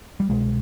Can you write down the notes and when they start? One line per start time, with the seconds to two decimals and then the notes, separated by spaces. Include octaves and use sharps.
0.20 G3
0.29 C2 B2 G#3